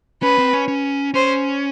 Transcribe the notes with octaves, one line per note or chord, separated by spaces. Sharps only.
C#4 B4
C4
C#4
C#4
C#4 C5